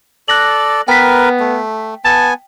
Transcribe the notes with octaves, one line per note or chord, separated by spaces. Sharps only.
A4 D5 F#6 A#6 F#7
B3 A#4 B4 G5 B6
A3
B3 G#5 A5